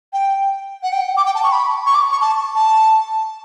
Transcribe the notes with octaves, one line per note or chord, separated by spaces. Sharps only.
G5
F#5
G5
F#5
D6
G5
A5
C#6
B5
C#6
D6
C#6
A5
A5